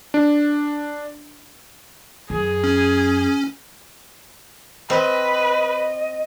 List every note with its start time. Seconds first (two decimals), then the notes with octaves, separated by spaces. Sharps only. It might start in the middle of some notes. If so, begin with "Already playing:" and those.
0.14 D4
2.30 F#2 G#4
2.64 C#4
4.90 C4 B4 D#5